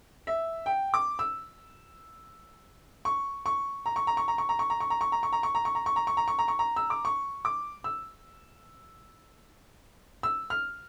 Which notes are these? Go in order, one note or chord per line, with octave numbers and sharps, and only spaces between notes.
E5
G5
D6
E6
C#6
C#6
A#5
C#6
A#5
C#6
A#5
C#6
A#5
C#6
A#5
C#6
A#5
C#6
A#5
C#6
A#5
C#6
A#5
C#6
A#5
C#6
A#5
C#6
A#5
C#6
A#5
C#6
A#5
E6
D6
C#6
D6
E6
E6
F6